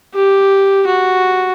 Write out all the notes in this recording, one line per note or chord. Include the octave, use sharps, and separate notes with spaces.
G4
F#4